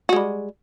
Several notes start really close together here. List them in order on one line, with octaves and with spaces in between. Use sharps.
F#4 G#3 G3